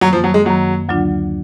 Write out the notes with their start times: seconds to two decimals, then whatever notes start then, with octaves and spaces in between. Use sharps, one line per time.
0.01 F#2 D#3 F#3 A#3
0.13 F3
0.24 F#3
0.34 G#3
0.45 F#2 D#3 F#3 A#3
0.89 D2 D3 F#3 D4 F4